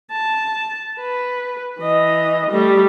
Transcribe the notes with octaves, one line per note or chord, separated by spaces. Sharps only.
A5
B4
E3 D#5
G3 A3